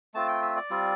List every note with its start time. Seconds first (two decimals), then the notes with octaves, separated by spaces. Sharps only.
0.14 A3 C4 F4 A5
0.28 G5
0.42 E5
0.56 D5
0.70 G3 C4 F4